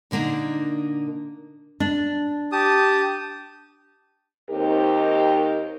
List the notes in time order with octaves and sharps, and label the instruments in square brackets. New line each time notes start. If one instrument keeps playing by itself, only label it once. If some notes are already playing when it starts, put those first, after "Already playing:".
[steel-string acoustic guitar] A#2 D3 A#3 D4 D#4
[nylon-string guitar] D4
[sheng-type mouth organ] G4 A5 D#6
[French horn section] D#2 C4 D#4 G4 A#4